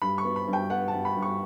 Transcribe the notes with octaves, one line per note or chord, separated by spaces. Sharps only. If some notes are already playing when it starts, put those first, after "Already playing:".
G2 B5
C#6
B3
B5
G2
G5
B3 F#5
A5
G2
B5
G2
C#6